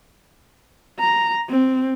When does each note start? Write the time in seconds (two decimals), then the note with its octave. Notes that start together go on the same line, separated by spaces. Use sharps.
1.00 A#5
1.50 C4